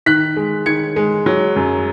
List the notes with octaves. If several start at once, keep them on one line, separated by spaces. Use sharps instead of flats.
D#3 F#6 B6
G#3
D#3 G#6 C#7
G#3
F#3
F#2